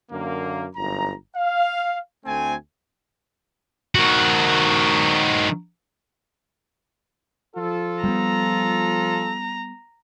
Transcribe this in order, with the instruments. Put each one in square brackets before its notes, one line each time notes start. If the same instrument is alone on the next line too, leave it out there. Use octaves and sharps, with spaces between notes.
[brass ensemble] F#2 D3 A#3
G1 F#2 A#5
F5
D2 A3 C4 G#5
[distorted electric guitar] D#3 F#4
[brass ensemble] F3 F4 A4
[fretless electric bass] G3 A3 B3 [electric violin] A#5